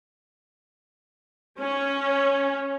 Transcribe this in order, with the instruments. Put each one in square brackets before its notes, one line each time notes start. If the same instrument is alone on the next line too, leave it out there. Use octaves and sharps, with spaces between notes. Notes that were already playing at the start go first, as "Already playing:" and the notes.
[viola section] C#4